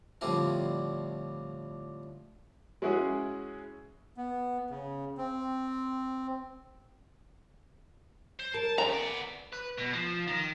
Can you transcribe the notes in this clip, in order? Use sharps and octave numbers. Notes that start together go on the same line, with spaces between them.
A2 D3 F3 G3 C4 E4
G#3 C#4 E4 F#4 G#4
B3
C#3
C4
C5
A#4 A5
G#2 A3 A#5
B3 D5
B4
B2
F3
D#3